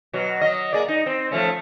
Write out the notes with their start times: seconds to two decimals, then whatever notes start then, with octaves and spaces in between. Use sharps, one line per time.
0.13 B2 F#3
0.41 F#3 D#5
0.73 A#3 G#4 D5
0.88 D#4
1.06 C4
1.31 F3 A3 C#4